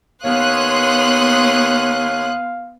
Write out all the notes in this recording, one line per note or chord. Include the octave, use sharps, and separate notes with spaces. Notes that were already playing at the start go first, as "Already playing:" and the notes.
D#2 B3 C#5 F5 C6 D#6 F#6